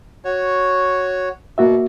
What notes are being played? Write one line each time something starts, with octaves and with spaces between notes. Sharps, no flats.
F#4 C#5
B2 A#3 F#4 E5